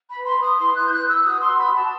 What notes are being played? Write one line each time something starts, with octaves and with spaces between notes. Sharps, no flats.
B5
B4
C6
B4
D#6
E4 C6
F#6
B4
G6
F#6
B4
E6
F#4 D#6
F#4 C6
B5
F#4 A5